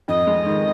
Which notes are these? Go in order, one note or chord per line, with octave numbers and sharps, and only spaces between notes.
F2 D#5
G#3
D#3